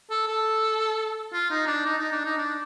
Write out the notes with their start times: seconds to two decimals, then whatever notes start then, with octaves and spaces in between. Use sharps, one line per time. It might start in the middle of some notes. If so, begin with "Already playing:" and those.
0.10 A4
0.28 A4
1.33 F4
1.51 D#4
1.67 D4
1.86 D#4
1.98 D#4
2.12 D4
2.25 D#4
2.38 D4